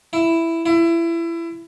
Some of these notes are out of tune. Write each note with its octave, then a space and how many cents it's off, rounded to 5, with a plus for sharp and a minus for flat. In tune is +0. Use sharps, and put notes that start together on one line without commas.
E4 +5
E4 +25